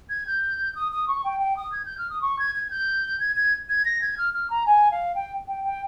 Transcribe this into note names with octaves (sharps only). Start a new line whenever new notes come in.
G#6
G6
D#6
D#6
C#6
G5
G5
D#6
G#6
G6
F6
D#6
C#6
G#6
G#6
G6
G#6
G#6
G#6
A#6
G#6
F6
F6
A#5
G#5
F5
G5
G5
G5